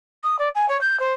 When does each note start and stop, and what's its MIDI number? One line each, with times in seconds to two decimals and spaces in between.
0.24 0.37 87
0.39 0.49 74
0.55 0.66 80
0.69 0.80 73
0.81 0.99 91
1.00 1.14 72